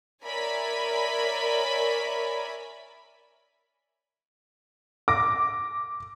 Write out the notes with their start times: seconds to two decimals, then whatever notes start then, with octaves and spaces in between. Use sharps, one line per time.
0.24 A#4 C#5 D5 E5 G#5 B5
5.08 D6 A#6